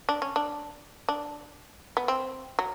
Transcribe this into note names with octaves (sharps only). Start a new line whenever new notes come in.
D4
C#4
D4
D4
B3
C4
F#3